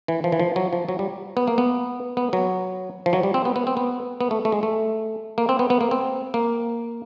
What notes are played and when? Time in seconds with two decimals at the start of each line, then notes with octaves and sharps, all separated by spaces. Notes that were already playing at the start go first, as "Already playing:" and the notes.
0.08 E3
0.24 F3
0.32 E3
0.40 F3
0.56 F#3
0.73 F3
0.89 F#3
0.99 G3
1.37 B3
1.48 A#3
1.58 B3
2.17 B3
2.33 F#3
3.06 F3
3.13 F#3
3.23 G3
3.34 C4
3.45 B3
3.56 B3
3.67 C4
3.77 B3
4.21 B3
4.31 A3
4.45 A3
4.52 G#3
4.63 A3
5.38 A#3
5.49 C4
5.59 B3
5.70 B3
5.81 A#3
5.91 C4
6.34 A#3